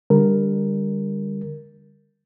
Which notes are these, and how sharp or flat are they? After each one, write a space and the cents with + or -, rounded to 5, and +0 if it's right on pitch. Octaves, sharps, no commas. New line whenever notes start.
D3 +10 G3 +25 A#4 +0